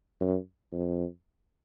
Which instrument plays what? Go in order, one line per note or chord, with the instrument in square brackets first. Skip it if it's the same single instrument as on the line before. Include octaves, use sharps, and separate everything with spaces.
[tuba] F#2
F2